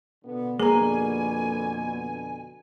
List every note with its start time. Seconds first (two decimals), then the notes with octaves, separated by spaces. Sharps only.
0.25 B2 D3 B3
0.60 F2 B2 D3 A#3 G#4 G#5 A#5